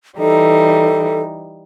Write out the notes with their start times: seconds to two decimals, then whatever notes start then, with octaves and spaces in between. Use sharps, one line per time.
0.18 E3 G3 D#4 A4